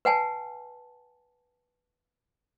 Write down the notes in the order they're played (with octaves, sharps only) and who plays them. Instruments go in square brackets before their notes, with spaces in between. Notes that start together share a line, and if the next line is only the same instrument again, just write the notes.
[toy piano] B4 F#5 G#5 A5